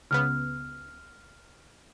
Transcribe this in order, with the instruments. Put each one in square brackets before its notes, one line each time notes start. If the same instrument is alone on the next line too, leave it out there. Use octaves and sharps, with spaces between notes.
[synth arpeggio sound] C#2 C#3 B3 [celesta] F6